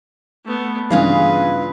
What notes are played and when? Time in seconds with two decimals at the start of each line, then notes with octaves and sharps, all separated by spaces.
0.45 A3 B3
0.90 G2 C#3 E3 F4 G#4 B4 F5